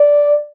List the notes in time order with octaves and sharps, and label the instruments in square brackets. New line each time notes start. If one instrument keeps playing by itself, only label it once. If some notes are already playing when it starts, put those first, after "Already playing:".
Already playing: [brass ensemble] D5